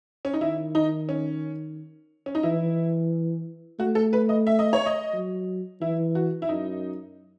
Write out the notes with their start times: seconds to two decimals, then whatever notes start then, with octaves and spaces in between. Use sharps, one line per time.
0.25 C#4
0.33 D#4
0.41 D#3 E4
0.75 D#4
1.09 C#4
2.26 C#4
2.35 D#4
2.43 E3 E4
3.79 A3 F#4
3.95 A4
4.13 B4
4.29 D#5
4.47 E5
4.59 D#5
4.73 C#5
4.86 D#5
5.14 F#3
5.81 E3 E4
6.15 F#4
6.42 E4
6.49 F#2 D#4